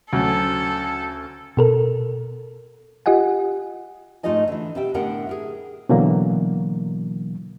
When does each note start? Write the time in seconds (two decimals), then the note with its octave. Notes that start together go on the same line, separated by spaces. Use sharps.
0.13 D2 C#3 F#3 A4
1.57 B2 A4 A#4
3.06 F4 G4 D#5 F#5 G#5
4.23 G#2 A3 D#4 F4 D#5 G#5
4.48 D3 E3
4.75 B2 G4 E5 G5
4.94 A2 D3 B3 A#4 F#5 G5
5.27 G#4 A#4 E5
5.89 B2 D3 E3 F#3 A#3